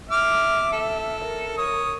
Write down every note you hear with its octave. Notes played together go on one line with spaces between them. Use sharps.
E5 D6 F6
A4
A#4
C#5 D#6